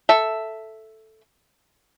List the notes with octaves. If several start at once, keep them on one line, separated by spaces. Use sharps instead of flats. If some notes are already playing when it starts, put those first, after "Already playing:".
A4 E5